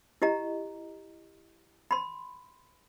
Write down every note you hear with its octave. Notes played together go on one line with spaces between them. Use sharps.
E4 G4 D#5 A#5
B5 C6